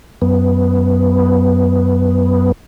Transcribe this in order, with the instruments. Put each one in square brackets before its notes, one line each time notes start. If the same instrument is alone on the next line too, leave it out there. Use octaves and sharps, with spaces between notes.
[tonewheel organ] F#2 B3